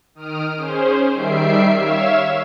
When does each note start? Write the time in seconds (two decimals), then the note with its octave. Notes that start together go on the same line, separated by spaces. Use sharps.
0.15 D#3 D#6 F6 D7
0.57 C#4 G#4 C5
1.12 D#3 G3 E5 C7 D7
1.73 C#5 E5 F5 E7